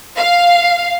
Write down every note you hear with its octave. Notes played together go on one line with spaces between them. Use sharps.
F5